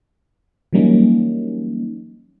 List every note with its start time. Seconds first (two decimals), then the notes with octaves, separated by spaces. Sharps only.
0.73 E3 F#3 G3 A#3 C#4 D#4